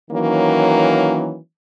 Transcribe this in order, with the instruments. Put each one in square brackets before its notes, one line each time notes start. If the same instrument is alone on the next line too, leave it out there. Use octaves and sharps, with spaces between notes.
[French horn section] D#3 E3 F#3 A#3 C#4